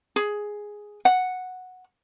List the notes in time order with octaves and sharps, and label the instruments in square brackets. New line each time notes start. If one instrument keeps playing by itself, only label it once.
[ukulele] G#4
F#5